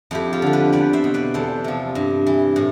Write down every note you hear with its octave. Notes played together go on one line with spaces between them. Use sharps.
F2 E4 G4
F4 A4
D3 F3
G4 B4
E2 B4 D5
C5 E5
B2
B4 D5
E2 A4 C5
C3 F3
G2
E3
A2